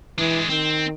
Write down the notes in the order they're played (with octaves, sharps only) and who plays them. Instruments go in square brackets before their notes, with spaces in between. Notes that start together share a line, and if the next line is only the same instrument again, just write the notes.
[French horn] E3 [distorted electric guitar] G#3 D4
[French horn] D#3 [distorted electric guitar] C4